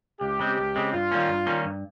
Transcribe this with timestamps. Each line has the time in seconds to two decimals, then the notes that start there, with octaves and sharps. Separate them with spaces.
0.21 C#2 G4
0.39 C#3 G#3 C4
0.58 C#2
0.76 C#3 G#3 C4
0.93 G2 F4
1.11 D#3 G3 A#3 C#4
1.29 G2
1.46 D#3 G3 A#3 C#4
1.65 G2